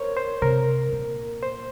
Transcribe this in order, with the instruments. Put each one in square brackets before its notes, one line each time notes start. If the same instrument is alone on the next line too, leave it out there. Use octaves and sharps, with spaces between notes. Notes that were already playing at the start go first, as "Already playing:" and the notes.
Already playing: [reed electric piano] A#4 C5 C#5
C5
[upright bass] C3 [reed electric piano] A#4
[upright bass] A#2
[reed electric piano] C5